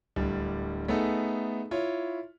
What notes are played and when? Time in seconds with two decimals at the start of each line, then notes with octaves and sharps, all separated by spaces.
0.16 D1 G3 D4
0.88 A3 B3 D#4 G#4 A4
1.71 E4 F4 C#5